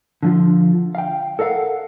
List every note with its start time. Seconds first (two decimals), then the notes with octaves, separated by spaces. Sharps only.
0.23 D3 F3 F4
0.95 F5 G5
1.39 A4 A#4 D5 F5 F#5